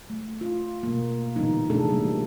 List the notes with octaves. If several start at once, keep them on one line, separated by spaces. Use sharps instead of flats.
A3
F4
B2 A#3
A#2 D3 E3 G3 B3 D#4
C3 F3 A3 D4 G#4 A4
E3 G3 A#3